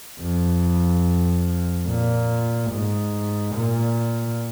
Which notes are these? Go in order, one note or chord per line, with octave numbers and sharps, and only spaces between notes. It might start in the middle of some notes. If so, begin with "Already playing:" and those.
F2
A#2
G#2
A#2